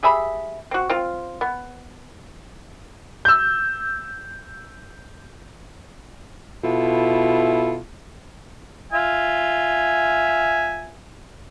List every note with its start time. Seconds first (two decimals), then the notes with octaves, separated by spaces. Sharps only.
0.03 G4 G#4 E5 B5
0.71 C4 F#4
0.90 C4 F4
1.41 B3
3.25 E6 G6
6.64 B2 E4 F4 A4
8.92 F4 E5 G#5